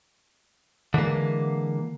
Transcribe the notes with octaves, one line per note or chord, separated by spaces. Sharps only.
D3 E3 G#3 A#3